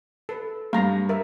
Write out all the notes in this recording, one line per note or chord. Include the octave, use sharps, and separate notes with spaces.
A4 B4
G2 F5 A#5
A#4 E5